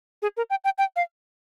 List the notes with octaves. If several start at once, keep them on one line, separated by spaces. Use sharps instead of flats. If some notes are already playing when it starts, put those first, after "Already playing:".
G#4
A#4
G5
G5
G5
F5